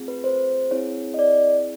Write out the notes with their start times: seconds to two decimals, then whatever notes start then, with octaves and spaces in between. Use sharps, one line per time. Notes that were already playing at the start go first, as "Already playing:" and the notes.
Already playing: A3 C4 F4 G#4
0.08 B4
0.24 C5
0.71 C4 E4 G#4 C#5
1.14 D#5
1.19 D5